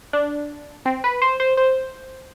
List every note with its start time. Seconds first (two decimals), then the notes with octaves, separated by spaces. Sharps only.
0.13 D4
0.86 C4
1.04 B4
1.22 C5
1.40 C5
1.57 C5